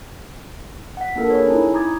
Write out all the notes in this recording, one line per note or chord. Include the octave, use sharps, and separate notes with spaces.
F#5 B6
A#3 D4 F4 A4 A#4
G#4 A4 B4 C#5
C#4 D#4 E4
A#5 D6 D#6 G#6 A6